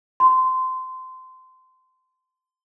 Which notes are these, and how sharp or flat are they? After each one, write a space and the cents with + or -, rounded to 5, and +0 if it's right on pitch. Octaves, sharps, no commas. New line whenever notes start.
C6 -20